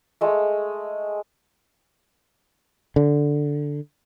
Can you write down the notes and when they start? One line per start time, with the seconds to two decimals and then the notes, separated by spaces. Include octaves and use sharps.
0.21 G#3 A3
2.96 D3